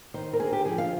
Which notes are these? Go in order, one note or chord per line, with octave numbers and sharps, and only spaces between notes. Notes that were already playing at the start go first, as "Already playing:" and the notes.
D#3 C5
A#4
D3 G#4
G4
F3 G#4
F5